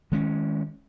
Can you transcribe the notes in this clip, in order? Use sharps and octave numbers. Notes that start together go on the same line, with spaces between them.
D#3 G#3 C#4